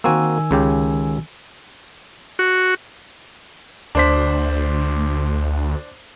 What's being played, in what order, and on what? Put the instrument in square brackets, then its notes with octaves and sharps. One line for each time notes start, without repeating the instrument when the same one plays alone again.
[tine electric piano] D#3 G#5 E6 [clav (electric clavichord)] A#3 C4 F#4
[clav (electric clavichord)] C#2 C#3 G4
[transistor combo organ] F#4
[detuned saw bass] D2 [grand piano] D4 C5 B6